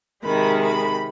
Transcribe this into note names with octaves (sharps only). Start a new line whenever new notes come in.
C3 D#3 G#3 B5
B5